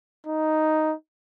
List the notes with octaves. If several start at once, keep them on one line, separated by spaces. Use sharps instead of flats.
D#4